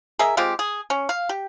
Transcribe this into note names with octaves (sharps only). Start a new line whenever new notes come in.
G#4 A#4 D#5 E5
G#3 C4 F4 G4
G#4
C#4
F5
G4